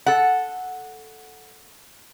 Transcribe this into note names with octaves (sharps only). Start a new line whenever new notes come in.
A4 F#5